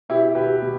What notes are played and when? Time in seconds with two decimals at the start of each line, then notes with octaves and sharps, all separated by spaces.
0.09 B2 E4 G4
0.35 B2 G4 B4
0.62 B2